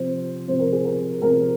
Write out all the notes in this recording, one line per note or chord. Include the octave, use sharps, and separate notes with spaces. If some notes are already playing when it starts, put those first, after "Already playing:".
Already playing: C3 F3 C4 C5
C3 F3 C4 C5
A#4
G#4
A#4
C3 F3 C4 A#4